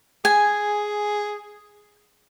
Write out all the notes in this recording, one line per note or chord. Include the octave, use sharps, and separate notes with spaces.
G#4 G#5